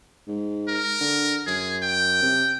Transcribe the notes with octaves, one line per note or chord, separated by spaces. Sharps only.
G#2
A#4
D3
F#2 G#4
G5
C3